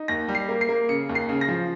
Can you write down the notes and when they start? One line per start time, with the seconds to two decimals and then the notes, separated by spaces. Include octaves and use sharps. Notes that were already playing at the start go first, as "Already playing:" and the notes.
Already playing: D#4
0.08 D#2 A#6
0.28 G3
0.35 C7
0.49 A#3
0.61 C7
0.69 A#3
0.89 C#3 C#7
1.09 D#2
1.15 C7
1.29 C#3
1.41 A#6
1.48 F3